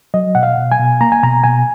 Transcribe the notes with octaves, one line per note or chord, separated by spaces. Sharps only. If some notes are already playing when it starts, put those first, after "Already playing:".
F#3 D#5
B2 F#5
F5
B2
G#5
B2
A#3 A#5
G#5
B2 A#5
B2 G#5